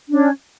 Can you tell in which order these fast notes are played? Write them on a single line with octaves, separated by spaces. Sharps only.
D4 C#4 C#5